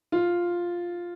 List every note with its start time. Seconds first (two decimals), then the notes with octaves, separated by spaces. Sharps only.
0.12 F4